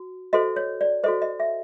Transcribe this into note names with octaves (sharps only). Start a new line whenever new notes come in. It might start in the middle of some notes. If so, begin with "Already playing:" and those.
Already playing: F#4
F#4 A4 C5 D#5
C#5
D5
F#4 A4 C5 D#5
D#5
E5